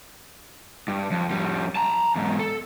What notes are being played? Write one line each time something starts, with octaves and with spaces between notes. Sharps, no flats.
G2
F2
F2 G3
A5 A#5
E2 G#2
A4